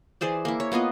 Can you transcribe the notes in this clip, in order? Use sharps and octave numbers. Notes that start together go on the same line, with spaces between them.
E3 G#4 C5 D5
A#3 E4
C#5
A#3 B3 F4 D#5